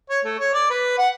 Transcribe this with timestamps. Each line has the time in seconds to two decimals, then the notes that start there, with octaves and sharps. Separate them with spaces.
0.10 C#5
0.25 A3
0.39 C#5
0.54 D5
0.70 B4
0.98 F#5